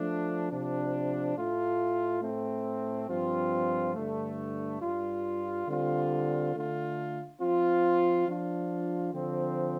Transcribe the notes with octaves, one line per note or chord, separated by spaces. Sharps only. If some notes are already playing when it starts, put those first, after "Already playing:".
Already playing: F3 A3 D4
C3 F3 D4
A2 A3 F4
A2 A3 C4
G2 F3 C4 F4
G2 D3 A3
G2 G3 F4
D3 G3 C4 F4
D3 A3 F4
F3 C4 F4
F3 D4 F4
D3 F3 C4